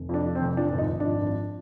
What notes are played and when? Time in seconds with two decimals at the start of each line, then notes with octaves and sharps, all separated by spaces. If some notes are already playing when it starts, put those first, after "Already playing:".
Already playing: F1
0.09 F2 D4
0.26 F3
0.35 C4
0.41 F1
0.57 F3 D4
0.73 G#1
0.78 D#4
0.90 G#1
1.00 F3 D4
1.22 G#1